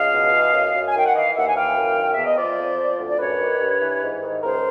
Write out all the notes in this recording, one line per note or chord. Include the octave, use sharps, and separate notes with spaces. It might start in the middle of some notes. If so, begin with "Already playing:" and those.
Already playing: C#2 D#5 F5
B2
E3
F#2
F#2
G#5
D#3 G5
F#5
E3 D#5 F5
D#2 E5 F#5
G#5
E3 F5 G5
F#2
D#3
E5
E2
D#5
F3 C5 D5
F2
F3
D2
D5
F#2 B4 C#5
D#3
G2
E3
G#2
D#3
C#2 A#4 C5